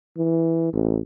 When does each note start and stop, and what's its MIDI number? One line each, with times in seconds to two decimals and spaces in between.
0.17 0.72 52
0.73 0.99 33